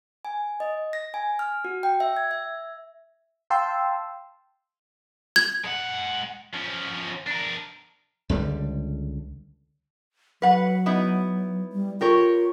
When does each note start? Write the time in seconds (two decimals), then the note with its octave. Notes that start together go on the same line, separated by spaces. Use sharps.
0.25 G#5
0.60 D#5
0.93 A#6
1.14 G#5
1.39 F6
1.65 F#4
1.83 G5
2.00 E5
2.16 G#6
2.31 E5
3.50 F5 G5 A5 C6 E6
5.36 G#6
5.64 G#3 F#5
6.54 F3 C#4
7.27 D4 A#4
8.29 C#2 D3 G3
10.42 F#3 B4 F#5
10.86 B3 D#4 E4
11.73 G3
12.01 F4 G4 A#4 C#5